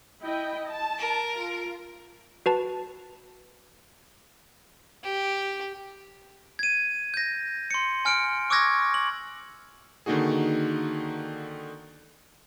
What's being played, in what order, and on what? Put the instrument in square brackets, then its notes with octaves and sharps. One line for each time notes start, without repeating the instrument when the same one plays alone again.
[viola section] E4 D#5 G5
A5
[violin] A#4
[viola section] F4
[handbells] F#4 B4 A5
[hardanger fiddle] G4
[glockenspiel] G#6 D#7
G6 A#6
C6 C#7
G#5 F6 C#7 D7
C#6 D6 E6 F#6 G#6 A#6
F#7
[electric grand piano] D3 D#3 A#3 D#4 F#4 G#4